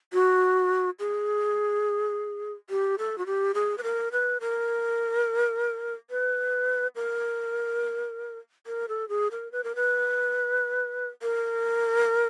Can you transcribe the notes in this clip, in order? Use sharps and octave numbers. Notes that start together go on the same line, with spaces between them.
F#4
G#4
G4
A4
F#4
G4
G#4
B4
A#4
B4
A#4
B4
A#4
A#4
A4
G#4
A#4
B4
A#4
B4
A#4